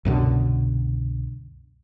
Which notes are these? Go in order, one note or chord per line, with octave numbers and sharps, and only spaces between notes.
C2 F#2 B2 D3